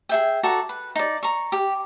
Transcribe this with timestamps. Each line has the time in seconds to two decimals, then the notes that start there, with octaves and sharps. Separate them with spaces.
0.09 G#4 E5 G5
0.43 F#4 A4 D5 A#5
0.69 B4
0.96 D#4 D5
1.23 A#5 C#6
1.52 G4